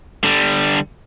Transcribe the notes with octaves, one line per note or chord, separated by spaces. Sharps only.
D3 G3